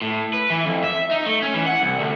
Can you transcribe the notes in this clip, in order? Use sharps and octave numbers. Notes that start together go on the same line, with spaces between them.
A2
B4
E3
F2
E5
D#4
A3
C#4
E3
F#5
C2
D2